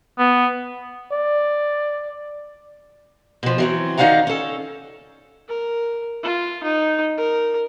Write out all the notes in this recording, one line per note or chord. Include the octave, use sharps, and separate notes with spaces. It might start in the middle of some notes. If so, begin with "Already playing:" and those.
B3
D5
B2 F3
E3 F#3 C4
D#3 D#4 D5 F5 F#5 A#5
C#4 A4
A#4
F4
D#4
A#4